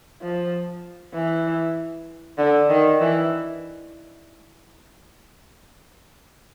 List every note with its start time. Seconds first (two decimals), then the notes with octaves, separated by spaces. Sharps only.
0.21 F3
1.14 E3
2.38 D3
2.70 D#3
3.01 E3